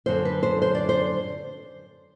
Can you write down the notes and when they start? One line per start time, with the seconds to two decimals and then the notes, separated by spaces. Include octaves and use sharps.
0.06 F#2 D3 F#3 C5
0.25 B4
0.43 C5
0.62 C5
0.75 D5
0.89 C5